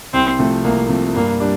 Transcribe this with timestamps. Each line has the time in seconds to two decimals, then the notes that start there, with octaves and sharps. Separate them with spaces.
0.13 C2 C4
0.39 C3 F3 A3
0.64 C2 A#3
0.89 C3 F3 A3
1.15 G2 A#3
1.40 G3 D4